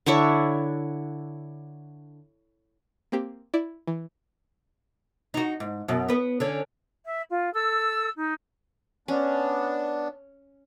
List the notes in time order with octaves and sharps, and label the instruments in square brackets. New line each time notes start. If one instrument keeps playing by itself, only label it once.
[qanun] D3 D4 E4 C#5
[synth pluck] A#3 C4 G4
E4 D5
E3
[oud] D#4 F#4
G#2
F#2 B2
B3 B4
D3 C#4
[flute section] E5
F4
A4 E6
D#4
[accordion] B3 D4 [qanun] C#4